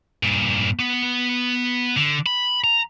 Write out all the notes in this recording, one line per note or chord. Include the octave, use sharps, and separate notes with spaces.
G2 A#2
B3
D3
B5
A#5